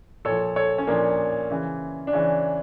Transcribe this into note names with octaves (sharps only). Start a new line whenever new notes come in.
A#2 F3 A4 C#5
A4 C#5
C#4
A#2 F3 A#3 D4
C#3 E3
D4
C#3 E3 C#4